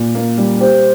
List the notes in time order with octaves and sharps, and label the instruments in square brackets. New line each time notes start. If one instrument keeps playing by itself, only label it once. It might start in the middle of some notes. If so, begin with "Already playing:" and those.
Already playing: [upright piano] A#2
A#3
G3
[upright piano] G4 [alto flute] C5